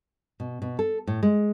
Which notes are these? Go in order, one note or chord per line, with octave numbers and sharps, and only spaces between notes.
B2
B2
A4
A2
G#3